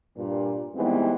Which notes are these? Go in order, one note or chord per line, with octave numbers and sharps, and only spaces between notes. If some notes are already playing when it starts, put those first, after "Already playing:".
G2 A#2
D#3 E3 G3 G#3 B3 C4